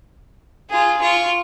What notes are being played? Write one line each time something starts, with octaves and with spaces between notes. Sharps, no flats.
F4 G#4
F4 C#6